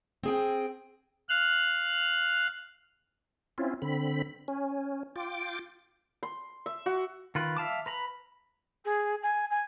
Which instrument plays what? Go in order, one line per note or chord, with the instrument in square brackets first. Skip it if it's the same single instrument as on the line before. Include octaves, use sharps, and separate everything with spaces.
[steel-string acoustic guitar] C4 G#4 G5
[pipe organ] F5 F6 F#6
[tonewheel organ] C4 C#4 E4 F4
D3 C4 B5
C#4
F4 G5 D6
[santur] C6
E5
F#4
[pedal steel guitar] D#3 F4 B4
E5 F5 A5 D6
B4 A#5 B5
[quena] G#4
G#5
G#5